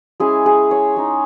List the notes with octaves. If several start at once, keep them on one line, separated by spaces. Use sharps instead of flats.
G#3 C#4 E4 G#4
G#4
C#5
G#3 D#4